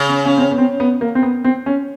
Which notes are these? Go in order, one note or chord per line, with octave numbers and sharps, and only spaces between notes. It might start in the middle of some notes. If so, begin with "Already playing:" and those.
Already playing: C#3
C#4
C#4
C4
C#4
B3
C4
B3
A#3
C4
B3
C4
C#4